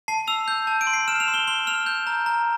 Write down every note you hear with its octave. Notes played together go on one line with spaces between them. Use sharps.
A5 C7
E6 F7
G6
A5
D7
C6
C7
F6 E7
F7
C6
G7
C6 G7
F6 F7
G6
A#5
A#5